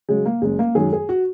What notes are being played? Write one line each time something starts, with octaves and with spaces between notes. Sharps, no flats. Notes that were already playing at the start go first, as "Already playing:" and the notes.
C#3 F#3 G#3
A#3
F#1 G#3
A#3
F#2 D#3 G#3 G#4
G#4
F#4